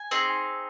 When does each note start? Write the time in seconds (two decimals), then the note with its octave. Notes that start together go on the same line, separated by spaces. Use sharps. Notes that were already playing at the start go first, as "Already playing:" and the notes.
Already playing: G#5
0.11 C4 D#4 G#4